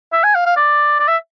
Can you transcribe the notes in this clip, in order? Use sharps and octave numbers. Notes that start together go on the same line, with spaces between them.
E5
G#5
F5
F5
D5
D5
E5